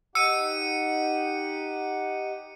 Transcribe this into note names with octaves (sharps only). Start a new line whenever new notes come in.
D#4 G4 F#5 E6 C#7 D#7